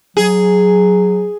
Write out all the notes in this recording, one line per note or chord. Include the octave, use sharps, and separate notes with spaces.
F#3 G#4